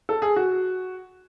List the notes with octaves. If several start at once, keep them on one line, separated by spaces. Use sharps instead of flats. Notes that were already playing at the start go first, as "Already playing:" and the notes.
A4
G#4
F#4